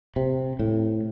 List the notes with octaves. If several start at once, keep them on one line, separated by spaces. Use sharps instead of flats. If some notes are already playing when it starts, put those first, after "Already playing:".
C3
A2